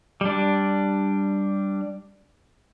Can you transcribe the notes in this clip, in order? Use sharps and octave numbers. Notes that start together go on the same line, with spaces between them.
G3 D4